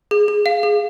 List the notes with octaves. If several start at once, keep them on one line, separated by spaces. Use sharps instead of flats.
G#4
G#4
F5
G#4